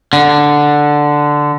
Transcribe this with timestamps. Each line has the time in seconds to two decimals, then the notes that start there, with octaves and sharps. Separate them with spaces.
0.13 D3